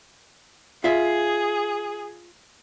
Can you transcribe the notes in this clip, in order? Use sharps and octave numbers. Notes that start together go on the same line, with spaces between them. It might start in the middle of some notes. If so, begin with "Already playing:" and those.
F4 G#4 E5